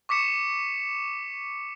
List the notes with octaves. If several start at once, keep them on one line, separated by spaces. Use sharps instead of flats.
C#6 D6 B6 C#7 E7